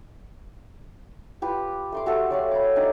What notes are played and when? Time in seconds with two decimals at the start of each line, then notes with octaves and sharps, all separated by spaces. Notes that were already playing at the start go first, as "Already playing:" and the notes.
1.42 F4 G4 B4
1.92 A3 C6 D6
2.06 A3 F#4 G4 A4
2.30 F#3 D5 F5
2.51 B5 D6
2.76 D4 D#4 G4